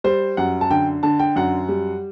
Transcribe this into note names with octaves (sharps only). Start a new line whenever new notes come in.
G3 C5
F#2 F#5
A5
D3 G5
D3 A5
G5
F#2 F#5
G3